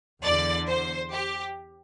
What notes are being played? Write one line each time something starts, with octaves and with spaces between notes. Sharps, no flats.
E2 D3 D5
C5
G4